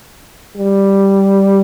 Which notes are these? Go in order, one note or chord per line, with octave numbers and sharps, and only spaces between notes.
G3